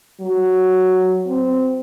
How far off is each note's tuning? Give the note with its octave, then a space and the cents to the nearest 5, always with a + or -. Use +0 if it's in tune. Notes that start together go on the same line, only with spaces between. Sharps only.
F#3 +0
C4 -15